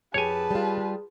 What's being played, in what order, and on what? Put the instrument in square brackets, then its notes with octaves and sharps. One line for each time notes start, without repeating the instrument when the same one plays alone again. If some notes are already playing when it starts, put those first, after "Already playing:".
[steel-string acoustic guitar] F2 G4 [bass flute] G#4 [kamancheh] B4 A5 [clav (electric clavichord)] C#5 G#5
[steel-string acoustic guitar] G3 F4